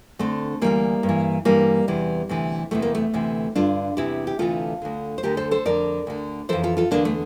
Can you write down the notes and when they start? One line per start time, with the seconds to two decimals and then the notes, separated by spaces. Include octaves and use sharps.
0.19 D2 D3 A3 C4
0.61 D2 C3 E3 G3 A#3
1.03 G2
1.09 E3
1.45 G2 E3 G3 A#3
1.88 E2 C3 E3
2.29 D2 C3 E3
2.71 E2 C3 E3 A3
2.82 A#3
2.95 A3
3.14 D2 C3 E3
3.55 G2 D3 D4 F4
3.97 E2 C3 E3 E4 G4
4.27 G4
4.39 D2 C3 E3 F4 A4
4.82 D2 D3
5.18 C5
5.23 D2 D3 G4 A#4
5.37 A4 C5
5.51 A4 C5
5.65 F2 D3 A#4 D5
6.07 D2 D3
6.49 F2 E3 A4 C5
6.63 F4 A4
6.77 F4 A4
6.91 E2 D3 A#3 D4
7.05 A3